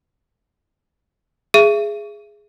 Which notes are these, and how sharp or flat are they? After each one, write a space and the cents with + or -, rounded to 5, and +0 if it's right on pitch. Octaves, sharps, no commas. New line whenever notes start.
G#4 +0 E5 +30